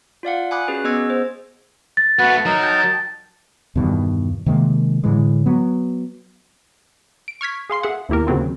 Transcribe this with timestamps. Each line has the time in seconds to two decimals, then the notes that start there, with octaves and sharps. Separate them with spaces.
0.23 F4 D5 F5 F#5
0.51 G#5 B5 D6 D#6 F#6
0.68 C#4 F#4 G#4 B4
0.84 B3 G#4 D#5 E6 G#6
1.10 C5
1.97 A6
2.19 A3 B3 F#4 B4 F#5
2.46 F#3 D#4 A#4
2.63 G5 A5
3.76 E2 G2 B2 D#3
4.46 C3 D#3 G#3 A#3
5.04 A2 D3 E3 G#3
5.46 F#3 B3
7.28 D7
7.41 C#6 F6 G#6 B6
7.70 G#4 F5 C6 C7
7.83 G#4 E5 F#5
8.09 D#2 B2 E4 G4 A#4
8.27 D#2 C#3 F#3 A#3 C4 F4